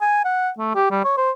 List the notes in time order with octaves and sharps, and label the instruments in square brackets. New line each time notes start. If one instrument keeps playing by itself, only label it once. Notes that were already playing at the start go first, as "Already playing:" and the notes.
[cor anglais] G#5
F#5
A3
G4
G3
C#5
C5